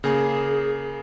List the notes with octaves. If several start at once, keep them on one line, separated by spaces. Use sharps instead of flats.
C#3 A#3 G#4 G#5